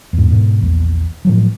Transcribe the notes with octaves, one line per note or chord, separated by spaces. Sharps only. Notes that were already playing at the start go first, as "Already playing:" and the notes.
E2 G#2
G#2 B2
A#1 E2
A2 F3 F#3